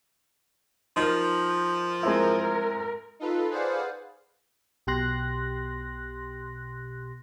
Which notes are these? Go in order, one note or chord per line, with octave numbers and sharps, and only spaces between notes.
F3 D#4 A#4
G#3 C4 E4 A#4
D#4 F4 A4 B4
G#4 B4 C5 D5 F5 F#5
B1 B2 G4 C6 F#6 A#6